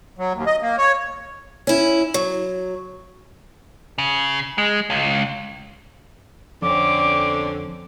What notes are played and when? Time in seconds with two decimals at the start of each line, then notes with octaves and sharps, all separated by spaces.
0.18 F#3
0.33 D#2
0.46 D#5
0.62 A#3
0.78 C#5
1.67 C#4 E4
2.14 F#3
3.98 C#3
4.58 G#3
4.90 C#2
6.62 F2 D3 C4 C#4 D6